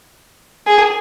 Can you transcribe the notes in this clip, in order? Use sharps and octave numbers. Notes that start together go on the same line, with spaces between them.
G#4